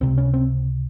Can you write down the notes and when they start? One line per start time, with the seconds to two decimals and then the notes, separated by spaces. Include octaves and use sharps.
0.01 C#2 C3 C4
0.18 C#4
0.34 C4